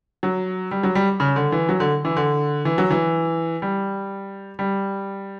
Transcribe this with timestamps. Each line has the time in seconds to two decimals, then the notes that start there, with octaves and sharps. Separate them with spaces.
0.23 F#3
0.71 G3
0.83 F#3
0.95 G3
1.20 C#3
1.36 D3
1.52 E3
1.69 F#3
1.80 D3
2.05 E3
2.17 D3
2.65 E3
2.78 F#3
2.90 E3
3.62 G3
4.59 G3